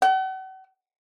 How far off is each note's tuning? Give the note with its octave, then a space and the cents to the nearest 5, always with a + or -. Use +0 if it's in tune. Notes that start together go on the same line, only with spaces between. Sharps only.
F#5 +40